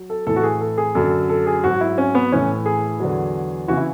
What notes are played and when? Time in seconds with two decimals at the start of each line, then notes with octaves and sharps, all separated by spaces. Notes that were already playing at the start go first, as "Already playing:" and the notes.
Already playing: F#3
0.10 A4
0.27 A2 E3 A4
0.36 F#4
0.43 G#4
0.61 A4
0.78 G#4
0.95 F#2 D3 F#3 A4
1.30 A4
1.47 G#4
1.64 G#2 F#3 F#4
1.81 E4
1.98 C#4
2.15 B3
2.32 A2 E3 C#4
2.66 G#4
3.00 E2 D3 F#3
3.68 C#3 E3 F#4
3.77 E4